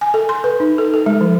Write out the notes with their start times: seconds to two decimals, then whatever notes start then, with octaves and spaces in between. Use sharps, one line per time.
0.01 G#5
0.14 A4
0.29 C6
0.44 B4
0.60 D#4
0.78 A4
0.94 A4
1.06 G#3
1.21 F3